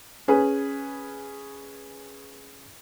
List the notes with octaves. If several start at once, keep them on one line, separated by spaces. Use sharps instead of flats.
C#4 G#4 B4